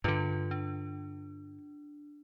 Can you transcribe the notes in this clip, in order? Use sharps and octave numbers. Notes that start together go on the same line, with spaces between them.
G2 D3 F4 B4
D4